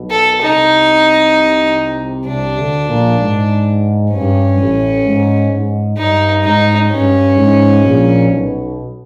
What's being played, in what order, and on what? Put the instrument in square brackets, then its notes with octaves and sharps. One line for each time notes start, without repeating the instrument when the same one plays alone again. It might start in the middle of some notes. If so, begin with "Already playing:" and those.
Already playing: [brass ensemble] B1 B2
[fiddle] A4
[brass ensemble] C2 C3 [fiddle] D#4
[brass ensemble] C2 C3 [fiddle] D4
[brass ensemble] D2 D3
A#1 A#2
G#2
[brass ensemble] G2 [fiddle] C#4
[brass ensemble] A1 A2
G#2
G#2
[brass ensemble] G2 [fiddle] D#4
[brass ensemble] G#2 [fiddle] D#4
[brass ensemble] G2 [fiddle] C#4
[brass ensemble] G#2
A#1 A#2
B1 B2